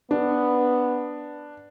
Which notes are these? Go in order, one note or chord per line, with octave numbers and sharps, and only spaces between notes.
B3 D4